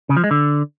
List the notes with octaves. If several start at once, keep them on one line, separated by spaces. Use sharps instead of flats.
C#3
F3
G#3
D3